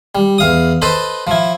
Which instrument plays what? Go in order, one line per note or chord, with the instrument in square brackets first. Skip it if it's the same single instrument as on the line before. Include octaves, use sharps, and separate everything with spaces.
[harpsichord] G3
E2 F5 D#6
A4 B4 C5 D#5 B5
F3 E4